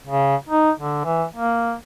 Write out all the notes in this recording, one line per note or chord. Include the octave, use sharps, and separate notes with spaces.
C#3
D#4
D3
E3
A#3